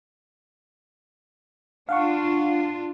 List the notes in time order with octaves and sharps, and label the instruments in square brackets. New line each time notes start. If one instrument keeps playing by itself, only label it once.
[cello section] D4 F4 [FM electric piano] F5 F#5 C#6